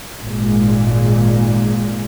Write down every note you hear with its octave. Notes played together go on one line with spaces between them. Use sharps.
G#1 A#2 G#3